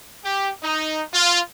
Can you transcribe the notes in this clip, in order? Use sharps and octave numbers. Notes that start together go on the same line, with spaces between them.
G4
D#4
F4